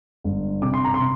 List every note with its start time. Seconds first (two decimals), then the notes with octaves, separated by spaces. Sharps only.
0.24 G1
0.62 C3 D6
0.74 C6
0.85 A#5
0.94 C6
1.01 C3